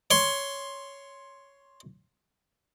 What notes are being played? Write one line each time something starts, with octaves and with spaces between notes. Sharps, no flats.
C#5 C6